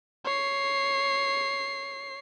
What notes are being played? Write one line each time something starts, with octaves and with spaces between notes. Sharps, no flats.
C#5 C7